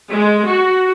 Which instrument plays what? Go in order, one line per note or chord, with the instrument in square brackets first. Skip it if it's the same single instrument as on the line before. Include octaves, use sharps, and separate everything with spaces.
[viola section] G#3
F#4